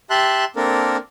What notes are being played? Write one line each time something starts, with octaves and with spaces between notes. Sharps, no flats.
G4 E5 A5 C6 F#6
A#3 C4 D4 A4 A#4